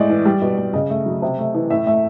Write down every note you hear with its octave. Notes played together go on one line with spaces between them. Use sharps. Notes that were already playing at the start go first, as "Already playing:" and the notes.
Already playing: A2 G#3 D5
E3
G3
B2
G3
C#3 D#5
A3
F#3
C3
A3
E3
A2 E5
A3 E5